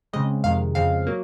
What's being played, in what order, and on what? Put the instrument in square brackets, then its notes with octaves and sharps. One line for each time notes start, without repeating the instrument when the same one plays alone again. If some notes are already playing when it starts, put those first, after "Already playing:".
[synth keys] C#3 G#3 C4 D#5
F2 C3 D#3 G#3 F5
F2 C#3 G#3 C4 F5
F#3 A#3